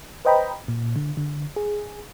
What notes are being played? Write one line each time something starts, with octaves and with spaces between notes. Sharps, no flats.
B4 C5 D#5 G5 A#5 B5
A#2
D3
D3
G#4